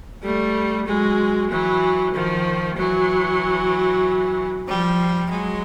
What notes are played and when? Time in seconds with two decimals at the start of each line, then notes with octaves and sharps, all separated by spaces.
0.23 G3 A3
0.86 F#3 G#3
1.50 E3 F#3
2.13 D#3 F3
2.77 E3 F#3
4.68 F3 G3
5.30 F#3 G#3